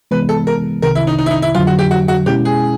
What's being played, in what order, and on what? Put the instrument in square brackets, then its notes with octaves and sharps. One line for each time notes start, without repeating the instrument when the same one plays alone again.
[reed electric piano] C2 C3 E3 G#3 B3 [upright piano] B4
[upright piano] A4
A#4
[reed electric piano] C2 C3 D#3 [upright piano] A#4
[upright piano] E4
D#4
D#4
E4
D#4
E4
[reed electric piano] F2 D3 F#3 [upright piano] F4
[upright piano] F#4
G4
F#4
F#4
[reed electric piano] B2 G#3 C#4 E4 [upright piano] G4
[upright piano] G#4